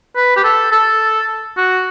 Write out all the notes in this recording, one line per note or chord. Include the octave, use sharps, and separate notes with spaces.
B4
G4
A4
A4
F#4